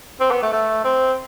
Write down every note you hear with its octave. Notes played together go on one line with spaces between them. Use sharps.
C4
B3
A3
A3
C4